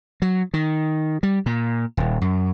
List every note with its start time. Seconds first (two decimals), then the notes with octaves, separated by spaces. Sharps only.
0.22 F#3
0.54 D#3
1.23 G3
1.46 A#2
1.97 D#1
2.21 F#2